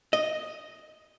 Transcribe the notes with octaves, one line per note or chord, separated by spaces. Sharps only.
D#5